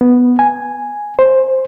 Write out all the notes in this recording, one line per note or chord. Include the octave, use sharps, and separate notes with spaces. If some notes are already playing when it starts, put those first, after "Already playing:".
B3
G#5
C5